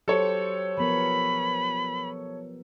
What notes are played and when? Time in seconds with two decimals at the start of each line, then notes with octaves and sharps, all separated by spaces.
0.08 F#3 G4 A4 C5 C#5
0.78 F3 B3 A#4 B5